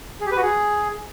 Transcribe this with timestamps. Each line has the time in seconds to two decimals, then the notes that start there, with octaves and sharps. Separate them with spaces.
0.21 G#4
0.26 G4
0.32 B4
0.37 F#4
0.42 G#4